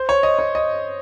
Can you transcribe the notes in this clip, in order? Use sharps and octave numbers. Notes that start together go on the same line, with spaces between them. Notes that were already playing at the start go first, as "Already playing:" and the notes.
Already playing: C5
C#5
D#5
C#5
D#5